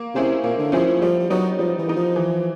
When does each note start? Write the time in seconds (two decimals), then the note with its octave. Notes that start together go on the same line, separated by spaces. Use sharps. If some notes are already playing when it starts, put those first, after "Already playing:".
Already playing: A#3
0.15 C3 C#4 E4 G#4 C5
0.44 A#2 A#3
0.59 D3
0.72 F3 C#4 E4 G#4 C5
0.87 F3
1.01 F3 G3
1.20 F3
1.30 F#3 B3 D#4
1.59 F3 G3
1.79 E3
1.88 B3 D#4
1.97 F3
2.16 E3